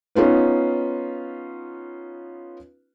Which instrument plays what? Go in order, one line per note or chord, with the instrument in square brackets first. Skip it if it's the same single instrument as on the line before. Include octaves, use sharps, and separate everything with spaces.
[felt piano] B3 C#4 D#4 F4 B4